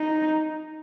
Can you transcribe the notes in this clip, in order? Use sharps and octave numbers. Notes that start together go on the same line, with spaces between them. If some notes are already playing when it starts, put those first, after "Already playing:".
Already playing: D#4